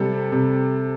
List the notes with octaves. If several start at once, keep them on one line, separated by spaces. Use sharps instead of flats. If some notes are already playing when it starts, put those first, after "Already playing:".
Already playing: C3 G3 A4
C3